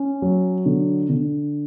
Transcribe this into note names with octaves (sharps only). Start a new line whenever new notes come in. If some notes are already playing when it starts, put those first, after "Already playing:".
Already playing: C#4
F#3
D3
D3